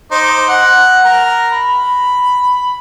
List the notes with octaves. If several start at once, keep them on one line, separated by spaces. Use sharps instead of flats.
D#4 C5 D6
F#5
A#4
B5